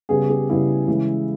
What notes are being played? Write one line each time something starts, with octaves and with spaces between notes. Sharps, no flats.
C#3 G3 B3 G#4
G4
C#3 G3 B3 E4
C#3 E3 G#3